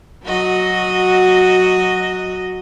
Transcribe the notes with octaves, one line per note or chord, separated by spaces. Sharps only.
F#3 F#4 D#5